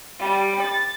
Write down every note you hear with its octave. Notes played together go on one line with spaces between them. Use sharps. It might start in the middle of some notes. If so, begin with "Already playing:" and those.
G3
A6